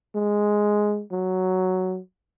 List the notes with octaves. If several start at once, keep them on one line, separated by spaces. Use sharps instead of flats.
G#3
F#3